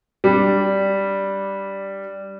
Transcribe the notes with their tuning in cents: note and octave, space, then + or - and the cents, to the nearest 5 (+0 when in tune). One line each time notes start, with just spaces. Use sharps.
G3 +0 D4 -5